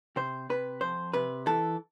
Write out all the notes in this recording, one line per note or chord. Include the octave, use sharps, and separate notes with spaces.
C3 C5
C3 B4
F2 C5
C3 B4
E3 A4